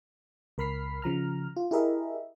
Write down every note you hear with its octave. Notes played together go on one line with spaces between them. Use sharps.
C#2 A#4 B5 F6 B6 C7
C#3 F3 A#5 F6
F4
E4 G4 G#4 A#4 D#5 E5